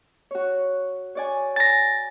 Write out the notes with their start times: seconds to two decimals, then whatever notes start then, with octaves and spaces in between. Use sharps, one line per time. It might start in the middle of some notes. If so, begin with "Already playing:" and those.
0.31 F#4 C#5
1.15 C#5 D5 G#5
1.56 G#5 A#5 A6 A#6